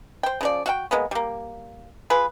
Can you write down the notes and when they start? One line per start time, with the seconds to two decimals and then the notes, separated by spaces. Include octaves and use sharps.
0.23 C5 G5
0.41 C#3 F3 D5
0.66 F#4 F5 G5
0.91 G#3 A#3 B3
1.11 G3 A#3
2.10 F4 G#4 B4